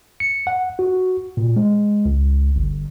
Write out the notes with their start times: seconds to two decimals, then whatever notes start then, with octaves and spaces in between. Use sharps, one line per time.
0.20 C#7
0.47 F#5
0.79 F#4
1.37 A#2
1.56 G#3
2.05 C#2
2.56 G1